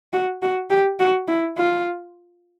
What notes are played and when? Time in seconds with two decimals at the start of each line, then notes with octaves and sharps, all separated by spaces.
0.13 F#4
0.42 F#4
0.70 G4
1.00 F#4
1.28 E4
1.57 F4